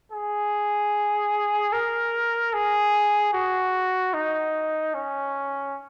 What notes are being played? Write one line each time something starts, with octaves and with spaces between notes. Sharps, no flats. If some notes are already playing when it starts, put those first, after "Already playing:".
G#4
A#4
G#4
F#4
D#4
C#4